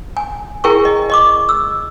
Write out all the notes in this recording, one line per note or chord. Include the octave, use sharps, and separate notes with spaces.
G#5
E4 G#4 A#4 G5 G#5 C#6
D#5
D#5 C#6 D6
E6